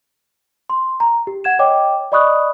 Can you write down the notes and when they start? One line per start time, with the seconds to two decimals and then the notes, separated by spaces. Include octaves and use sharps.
0.70 C6
1.00 A#5
1.27 G4
1.44 F#5 G#6 E7
1.59 C#5 D#5 G5 D6
2.12 D5 D#5 B5 C#6 D#6 F#6